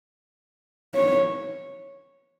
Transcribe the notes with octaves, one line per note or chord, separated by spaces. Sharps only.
C#5